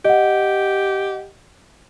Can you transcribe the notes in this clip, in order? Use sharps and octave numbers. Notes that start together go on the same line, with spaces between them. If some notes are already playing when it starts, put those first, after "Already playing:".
G4 D#5 F#5